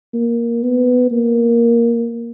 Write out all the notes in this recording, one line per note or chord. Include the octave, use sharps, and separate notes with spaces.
A#3
B3
A#3